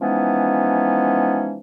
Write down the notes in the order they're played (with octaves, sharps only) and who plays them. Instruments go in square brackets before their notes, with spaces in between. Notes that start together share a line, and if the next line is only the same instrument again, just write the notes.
[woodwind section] E3 F3 G#3 B3 C#4 D#4